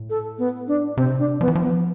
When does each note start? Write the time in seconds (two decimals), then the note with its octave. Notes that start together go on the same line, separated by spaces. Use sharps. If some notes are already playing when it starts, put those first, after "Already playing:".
Already playing: A2
0.10 A4
0.38 B3
0.68 D4
0.97 C3 C4
1.19 D4
1.41 F3 B3
1.48 E3
1.55 F3
1.62 B3